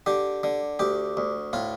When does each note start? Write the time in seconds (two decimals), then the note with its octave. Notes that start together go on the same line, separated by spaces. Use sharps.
0.06 D3 G4
0.43 D3
0.79 D2 G4
1.17 D2
1.53 A2 F4